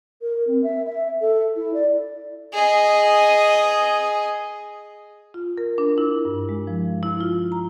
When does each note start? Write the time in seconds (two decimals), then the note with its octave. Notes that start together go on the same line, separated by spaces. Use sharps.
0.21 A#4
0.47 C4
0.64 E5
0.86 E5
1.21 A4
1.56 E4
1.74 D5
2.53 G#4 D#5
5.34 F4
5.58 A#4
5.78 D4
5.98 E4
6.25 G2
6.49 G#3
6.67 F3
7.03 E4
7.21 F4
7.52 A#5